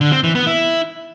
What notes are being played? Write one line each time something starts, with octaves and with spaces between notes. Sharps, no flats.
D3
C4
E3
B3
E4